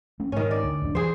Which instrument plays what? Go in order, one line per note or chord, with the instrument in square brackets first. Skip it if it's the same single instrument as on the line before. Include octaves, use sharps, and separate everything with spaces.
[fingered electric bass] A3 C#4
[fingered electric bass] G#2 [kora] D#3 C#4
[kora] D5
[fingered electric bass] D2
D1 F2 D4
[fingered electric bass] E3 [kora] G#4 C5